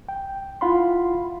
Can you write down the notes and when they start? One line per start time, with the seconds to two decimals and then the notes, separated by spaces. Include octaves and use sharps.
0.09 G5
0.61 E4 F4 F5 F#5 B5 C6